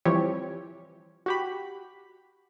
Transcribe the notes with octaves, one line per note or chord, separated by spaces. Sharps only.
E3 F3 G3 C4 G4 C#5
F#4 G4 B5